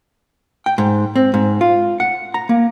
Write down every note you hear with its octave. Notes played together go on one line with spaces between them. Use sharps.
G5
G#2
C4
G#2
F4
F#5
A#5
A#3